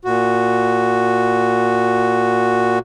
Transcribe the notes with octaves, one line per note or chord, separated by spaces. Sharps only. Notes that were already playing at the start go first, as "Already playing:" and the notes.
A#2 F#4